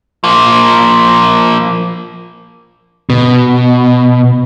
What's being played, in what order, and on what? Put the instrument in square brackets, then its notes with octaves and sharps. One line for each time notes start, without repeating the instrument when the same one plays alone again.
[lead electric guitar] F3 A#3
[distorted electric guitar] B2